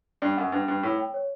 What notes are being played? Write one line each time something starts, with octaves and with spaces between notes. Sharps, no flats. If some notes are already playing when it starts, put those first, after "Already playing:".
G2 D5
F#2 F#5
G2 B4
G2 B4
A2 C#5
G5
C#5